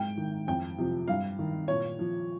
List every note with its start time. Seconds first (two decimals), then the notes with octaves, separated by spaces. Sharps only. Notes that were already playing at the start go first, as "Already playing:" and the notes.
Already playing: G#2 G5
0.17 D#3
0.47 F2 G5
0.78 C3 F3
1.08 G2 F5
1.39 D#3
1.68 A#2 C#5
1.99 F3